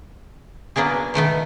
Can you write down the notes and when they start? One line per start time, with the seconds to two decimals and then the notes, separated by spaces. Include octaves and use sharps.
0.76 F#3 A#3 B3 D4 G#4
1.14 B2 D#3 A3 B3